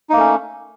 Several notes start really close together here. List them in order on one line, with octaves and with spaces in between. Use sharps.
D#4 A#3 A3 C#4